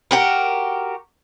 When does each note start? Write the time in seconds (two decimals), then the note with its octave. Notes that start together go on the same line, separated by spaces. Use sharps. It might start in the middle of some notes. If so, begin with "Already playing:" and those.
0.11 F#4 G4 A#4